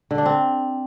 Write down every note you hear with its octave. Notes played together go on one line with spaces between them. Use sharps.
D3
D4
C4